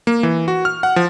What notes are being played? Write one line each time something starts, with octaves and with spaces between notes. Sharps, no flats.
A#3
E3
F#4
F6
F#5
F3